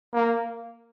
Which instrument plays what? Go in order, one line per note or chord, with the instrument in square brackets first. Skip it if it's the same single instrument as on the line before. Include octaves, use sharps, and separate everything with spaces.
[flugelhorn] A#3